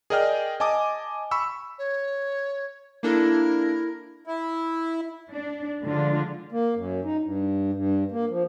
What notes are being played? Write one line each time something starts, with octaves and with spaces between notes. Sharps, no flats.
G#4 A#4 D5 D#5 G5 F6
D#5 G#5 A5 D6 D#6
B5 C#6 E6
C#5
A#3 D4 E4 A4 A#4
E4
D4
D3 F3 G#3 D4 F4
A#3
F#2
D#4
G2
G2
A#3
F3